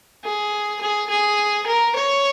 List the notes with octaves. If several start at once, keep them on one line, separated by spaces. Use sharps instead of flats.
G#4
G#4
G#4
A#4
C#5